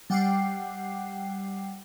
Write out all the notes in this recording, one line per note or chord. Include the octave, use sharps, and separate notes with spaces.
G3 F#5 G5 D6 F#6 C7